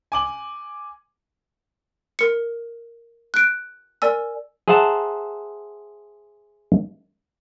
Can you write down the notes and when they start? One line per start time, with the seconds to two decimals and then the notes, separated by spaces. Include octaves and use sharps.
0.12 G#5 D6 F#7
2.19 A#4 C#7
3.34 F#6 D7
4.02 A#4 D5 G#5 E6
4.68 G#4 C5 E5 F#5 A5 A#5